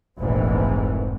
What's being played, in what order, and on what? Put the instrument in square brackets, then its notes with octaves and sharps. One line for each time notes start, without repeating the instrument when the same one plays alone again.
[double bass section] F1 A#1 G#2 E3